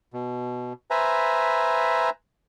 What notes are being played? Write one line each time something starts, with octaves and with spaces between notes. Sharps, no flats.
B2
B4 C5 E5 G#5 A#5